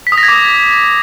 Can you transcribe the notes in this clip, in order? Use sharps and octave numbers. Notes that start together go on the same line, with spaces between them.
B6
D#6
A#6
G#6
D6